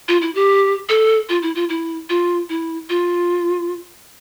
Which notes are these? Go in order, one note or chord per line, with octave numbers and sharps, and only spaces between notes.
F4
E4
G4
A4
F4
E4
F4
E4
F4
E4
F4